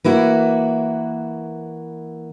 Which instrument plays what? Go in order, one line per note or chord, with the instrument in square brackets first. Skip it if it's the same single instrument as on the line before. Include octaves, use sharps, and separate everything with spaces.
[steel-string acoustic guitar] E3 A#3 E4 F#4